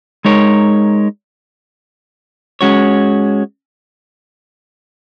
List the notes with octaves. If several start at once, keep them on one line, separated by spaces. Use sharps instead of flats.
G#3 D#4 A#4 C#5
G#3 C#4 F#4 C#5